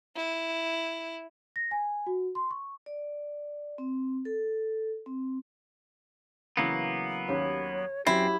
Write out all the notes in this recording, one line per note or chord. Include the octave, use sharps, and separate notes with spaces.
E4
A#6
G#5
F#4
C6
C#6
D5
C4
A4
C4
C#3 E3 F#3 A#3 B3
D#2 C#4 G4 C#5
F#2 F#3 C4 E4 G4